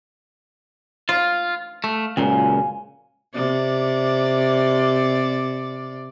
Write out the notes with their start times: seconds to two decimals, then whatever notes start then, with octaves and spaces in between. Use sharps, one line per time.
1.09 F4 F5
1.84 A3
2.17 C#2 F#2 A#2 G#5
3.34 C3 D5